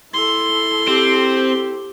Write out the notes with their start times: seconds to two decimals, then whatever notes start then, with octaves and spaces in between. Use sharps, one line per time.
0.14 E4 A4 C6
0.87 C4 G4